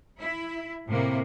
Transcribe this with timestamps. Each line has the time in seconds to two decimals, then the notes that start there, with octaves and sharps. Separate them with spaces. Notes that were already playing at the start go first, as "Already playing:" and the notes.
0.20 E4
0.88 A2 C3 A#3